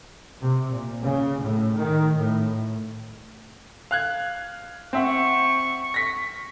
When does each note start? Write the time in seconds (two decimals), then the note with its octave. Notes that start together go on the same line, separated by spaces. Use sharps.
0.41 C3
0.73 A#2
1.04 C#3
1.42 A2
1.78 D#3
2.16 A2
3.91 F5 F#6 G#6
4.93 C4 E5 F#5 C#6
5.94 A#6 B6